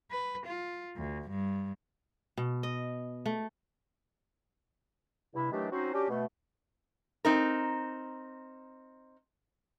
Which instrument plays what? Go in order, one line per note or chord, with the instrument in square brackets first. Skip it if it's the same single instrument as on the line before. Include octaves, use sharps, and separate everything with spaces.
[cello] B4
F4
D2
G2
[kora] B2
D#5
A3
[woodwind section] G2 C3 E4
D#3 E3 F#3 A3 D4 G4
F#3 C4 C#4 D#4 F#4 C5
C#4 D4 F#4 G4
B2 A3
[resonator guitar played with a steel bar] C4 D#4 A#4